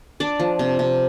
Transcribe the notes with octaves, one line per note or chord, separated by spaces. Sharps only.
D4 D5
F3
C3
C3